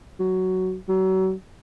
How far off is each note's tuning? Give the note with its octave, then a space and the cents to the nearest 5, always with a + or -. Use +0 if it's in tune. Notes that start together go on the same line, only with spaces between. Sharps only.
F#3 +10
F#3 +35